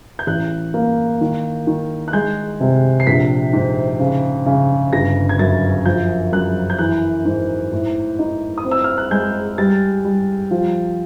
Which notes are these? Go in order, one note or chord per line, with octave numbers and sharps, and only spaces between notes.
G6
A1 F#6
A#3
D#3
D#3
F#6
G#3 G6
C3
C7
A#1 B6
G#2
C#3
C#3
G1 A#6
G#6
F#2 A6
F3 G6
F#2 F#6
G6
E3 F#6
G#2
A2
D#4
D#6
C4
E6
F6
F#6
G#3 G6
G3 A6
G3
F3